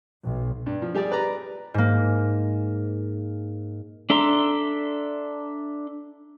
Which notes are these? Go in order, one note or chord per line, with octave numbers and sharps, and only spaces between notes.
B1
G2
F3
G3 G4 G#4 D5
B4 D5 A#5
G#2 A#3
D4 A4 E5 A#5 C6